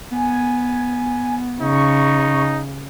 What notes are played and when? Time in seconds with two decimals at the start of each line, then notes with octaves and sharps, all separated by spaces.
0.12 B3 G#5
1.61 C#3 D#4 C#6